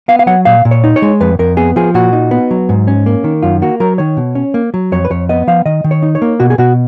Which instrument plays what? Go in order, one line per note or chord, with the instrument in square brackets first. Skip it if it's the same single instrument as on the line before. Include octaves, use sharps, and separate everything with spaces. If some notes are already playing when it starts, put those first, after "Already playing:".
[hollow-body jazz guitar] B3 F5
F5
F#3 F#5
A#2 F5
A#2
C#5
D#4
C#5
G#3
F2 B4
F2 A#4
B3 G#4
F3 G#4
A#2 F#4
D#4
B3
F#3
G#2
C#4
A#3
D#3
F#2 F4
A#3 F#4
F#3 A#4
D#3 C#5
B2
C#4
A#3
F#3
F2 C#5
B4
F2 C#5
B3 D#5
F3 F5
D#3 D#5
D#3
C#5
D#4
C#5
A#3
B2 F#4
G#4
B2 F#4